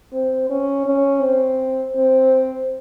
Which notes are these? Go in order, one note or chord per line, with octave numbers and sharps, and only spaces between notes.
C4
C#4
C#4
C4
C4